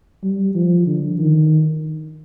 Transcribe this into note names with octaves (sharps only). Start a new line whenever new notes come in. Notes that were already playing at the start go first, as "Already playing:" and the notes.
G3
F3
D3
D#3